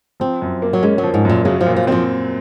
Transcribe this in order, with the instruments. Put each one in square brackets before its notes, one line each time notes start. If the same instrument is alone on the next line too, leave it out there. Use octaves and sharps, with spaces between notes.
[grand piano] F3 [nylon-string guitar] C4
[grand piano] F#2
A#3
[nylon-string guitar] F#3
[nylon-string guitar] G#3 [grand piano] C#4
[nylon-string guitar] F#3
[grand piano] F3
[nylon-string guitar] G#2
[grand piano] F#2 [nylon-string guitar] A#2
[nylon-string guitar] C#3 [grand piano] F#3
[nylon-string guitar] F3
[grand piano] A#2
[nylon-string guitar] F3
[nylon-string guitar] D#3 [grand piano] C4
[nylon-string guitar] F3